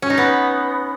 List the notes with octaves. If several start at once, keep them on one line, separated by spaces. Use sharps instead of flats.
C#4
D#4
B3